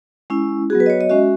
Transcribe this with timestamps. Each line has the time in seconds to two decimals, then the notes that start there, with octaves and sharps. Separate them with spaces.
0.30 G#3 C#4 E4
0.70 F#4 G#4
0.73 F#3 B3
0.80 B4
0.86 D#5
0.90 C#5
1.01 D#5
1.09 G#3 C#4 F#4 E5